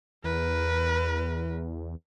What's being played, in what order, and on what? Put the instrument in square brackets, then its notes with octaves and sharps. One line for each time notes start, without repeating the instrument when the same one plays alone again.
[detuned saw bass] E2 [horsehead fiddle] A#4 B4